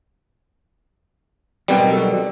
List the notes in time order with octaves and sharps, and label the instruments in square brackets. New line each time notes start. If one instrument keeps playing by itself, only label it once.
[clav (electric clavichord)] B2 D#3 G3 [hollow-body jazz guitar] F#3 C4 G5
[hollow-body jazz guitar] F#4 A4